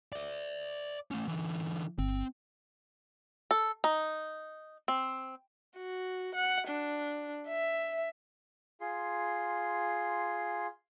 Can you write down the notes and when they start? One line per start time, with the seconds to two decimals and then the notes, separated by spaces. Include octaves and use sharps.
0.13 D5 E5
1.11 A3 C#4
1.27 D3 E3
1.98 G1 C4
3.51 A4
3.84 D#4
4.88 C4
5.77 F#4
6.35 F#5
6.69 D4
7.49 E5
8.81 F4 G#4 C6